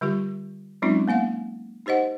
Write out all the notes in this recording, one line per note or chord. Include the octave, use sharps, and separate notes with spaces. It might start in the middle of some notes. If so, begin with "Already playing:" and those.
D3 G3 F4 G4
F#3 G#3 C4 C#4 D#4 F4
A#3 B3 F5 F#5
D#4 G4 C5 D#5 F#5